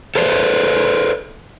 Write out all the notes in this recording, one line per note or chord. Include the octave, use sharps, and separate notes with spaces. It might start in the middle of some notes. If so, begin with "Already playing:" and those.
A4 B4 C5 D5